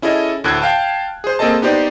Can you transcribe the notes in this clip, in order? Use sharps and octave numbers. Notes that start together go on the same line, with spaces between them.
C#4 E4 G#4 A4 D#5
D2 A2 A4 F#6 G#6
F5 G5 A5
G#4 C5
A#3 C4 G#4 A4 D#5 A5
B3 D#4 G4 C5 D5